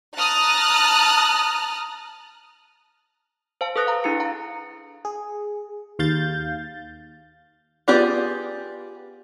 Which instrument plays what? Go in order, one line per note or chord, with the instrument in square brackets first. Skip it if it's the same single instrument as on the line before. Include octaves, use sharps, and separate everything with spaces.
[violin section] A5 A#5 D#6 F6 F#6 A6
[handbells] C5 F5 A5
A4 B4 D#6 F#6 A#6 D7
F5 A#5
D4 E4 G#4 C#7
F5 A#5
[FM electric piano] G#4
D#2 F5 G6 A6
[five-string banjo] B3 F4 G4 G#4 D5